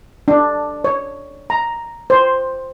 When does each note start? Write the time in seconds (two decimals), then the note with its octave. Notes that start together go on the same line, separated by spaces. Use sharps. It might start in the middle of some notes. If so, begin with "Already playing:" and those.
0.28 D4
0.84 C#5
1.50 A#5
2.10 C5